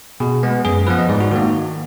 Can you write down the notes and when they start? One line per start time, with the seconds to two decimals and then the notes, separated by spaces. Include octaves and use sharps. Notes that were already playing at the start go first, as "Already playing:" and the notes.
0.20 B2 G#4
0.43 G#3 B3
0.65 F#2 G#4
0.87 F3 B3 B4
0.99 D#5
1.09 G#2 D5
1.21 F#4
1.31 D#3 A#3 F#4